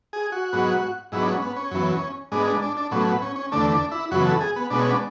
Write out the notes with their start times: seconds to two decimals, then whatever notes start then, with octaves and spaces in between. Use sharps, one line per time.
0.13 G#4
0.32 F#4
0.53 G#2 F#3 B3
1.12 G#2 F#3 B3 E4
1.22 D4
1.27 C#4
1.42 B3
1.56 C#4
1.71 F#2 E3 B3
2.32 G#2 G#3 B3 D4
2.47 D4
2.62 D4
2.77 D4
2.91 A2 F#3 B3 C#4
3.07 B3
3.22 C#4
3.36 C#4
3.52 E2 D3 A3 D4
3.72 D4
3.91 E4
4.11 F#2 C#3 E3 B3 F#4
4.25 A4
4.40 G#4
4.56 B3
4.70 B2 G#3 B3 D4
4.80 C#4
4.89 D4